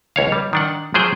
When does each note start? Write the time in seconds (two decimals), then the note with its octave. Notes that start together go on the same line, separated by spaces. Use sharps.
0.16 C#2 C#5 F5
0.32 G3
0.53 D#3 D4 F#5
0.94 F3 F#3 G#4 C5 G5